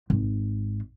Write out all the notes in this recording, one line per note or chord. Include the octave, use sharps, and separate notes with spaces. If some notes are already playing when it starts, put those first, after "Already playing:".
G#1